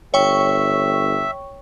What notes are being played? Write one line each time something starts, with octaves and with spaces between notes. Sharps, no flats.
G1 C#5 E5 G5 C#6